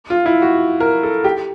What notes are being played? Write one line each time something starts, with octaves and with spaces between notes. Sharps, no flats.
F4
E4
F#4
A#4
A4
G4